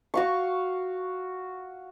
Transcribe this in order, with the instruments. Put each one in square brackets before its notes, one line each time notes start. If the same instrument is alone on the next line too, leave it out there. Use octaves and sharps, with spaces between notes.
[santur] F#4 F5 C#6